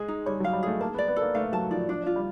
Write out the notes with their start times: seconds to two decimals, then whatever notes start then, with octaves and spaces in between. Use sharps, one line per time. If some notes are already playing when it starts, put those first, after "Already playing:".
Already playing: G#3 G#4
0.08 D#4
0.26 G3 C#5
0.40 F#3
0.44 F5
0.53 G3
0.63 A3 G#4
0.81 A#3 A5
0.94 B3
0.98 D5
1.08 B3
1.16 A4
1.22 A#3
1.35 A3 F5
1.52 F#3 A5
1.71 F3 D5
1.89 F3 D4
2.06 F4
2.16 G3